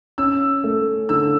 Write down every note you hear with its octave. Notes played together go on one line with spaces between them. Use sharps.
C#4 E6
A3
D3 E6